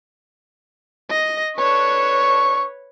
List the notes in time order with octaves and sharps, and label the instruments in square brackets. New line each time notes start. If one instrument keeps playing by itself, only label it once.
[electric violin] D#5 A#6
[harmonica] D4 A4 C#6 [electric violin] B4 C#5